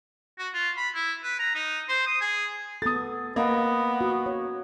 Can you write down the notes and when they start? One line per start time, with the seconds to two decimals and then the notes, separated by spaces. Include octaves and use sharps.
0.39 F#4
0.54 F4
0.77 B5
0.95 E4
1.23 B4
1.39 A#5
1.55 D#4
1.89 C5
2.07 D#6
2.21 G#4
2.82 B3 A4 D#6 A6
3.36 A#3 B3 D#5
4.01 F#4
4.26 C#5